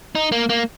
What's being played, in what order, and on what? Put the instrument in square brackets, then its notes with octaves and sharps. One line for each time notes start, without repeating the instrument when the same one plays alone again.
[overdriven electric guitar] D#4
A#3
A#3